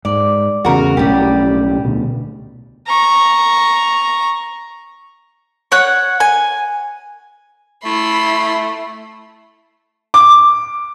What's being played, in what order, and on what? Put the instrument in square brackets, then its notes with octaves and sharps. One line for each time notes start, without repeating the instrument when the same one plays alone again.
[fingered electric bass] G#2 [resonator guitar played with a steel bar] D5
[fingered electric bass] E2 C#3 [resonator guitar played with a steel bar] F#4 A#4
[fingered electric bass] B1 A2 C#4 [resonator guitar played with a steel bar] G3 G4
[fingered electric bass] D2 B2
[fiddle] A#5 C#6
[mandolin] C#5 F#5 F#6
G#5
[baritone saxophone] A3 [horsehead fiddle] E4 [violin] B5 C6
[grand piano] D6